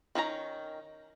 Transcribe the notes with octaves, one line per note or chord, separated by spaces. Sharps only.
D#3 C#4 D#4 A#5